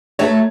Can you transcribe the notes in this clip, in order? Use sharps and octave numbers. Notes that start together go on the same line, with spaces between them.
F#3 A3 C#5